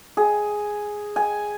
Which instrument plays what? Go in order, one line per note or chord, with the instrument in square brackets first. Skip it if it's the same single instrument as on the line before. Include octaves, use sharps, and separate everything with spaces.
[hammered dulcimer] G#4
G#5